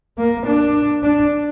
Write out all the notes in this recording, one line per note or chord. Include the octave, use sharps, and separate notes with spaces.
A#3
D4
D4